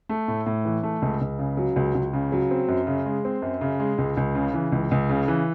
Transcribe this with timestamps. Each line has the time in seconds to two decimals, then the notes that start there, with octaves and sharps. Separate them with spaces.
0.09 A3
0.28 A2
0.46 A2
0.65 E3
0.83 A3
1.02 C#2
1.21 C#2
1.39 C#3
1.57 F#3
1.76 C#2
1.95 C#2
2.13 C#3
2.32 F#3
2.51 C4
2.69 F#2
2.87 C#3
3.06 G#3
3.25 C4
3.42 F#2
3.61 C#3
3.80 G#3
3.98 C#2
4.17 C#2
4.35 C#3
4.54 E3
4.72 C#2
4.91 C#2
5.09 C#3
5.28 E3